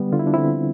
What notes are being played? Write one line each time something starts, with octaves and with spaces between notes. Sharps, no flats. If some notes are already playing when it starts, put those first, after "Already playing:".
Already playing: D3 G3 B3
D3 F4
E4
D4
D3 C4 E4